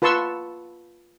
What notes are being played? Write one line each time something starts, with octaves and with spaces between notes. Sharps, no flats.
F4 B4 A5 C6 C#6 E6